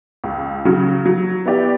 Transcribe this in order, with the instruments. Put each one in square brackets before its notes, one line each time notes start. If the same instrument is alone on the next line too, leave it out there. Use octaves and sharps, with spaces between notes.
[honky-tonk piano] C#2
C#3 F#3
F#3
B3 E4 G4 D5